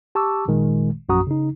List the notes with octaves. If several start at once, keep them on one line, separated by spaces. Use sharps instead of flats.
G4 A5 C#6 D6 E6
G#1 A#2 D#3 G#3
A#1 F#2 F#4 A#5 D#6
C#3 D#4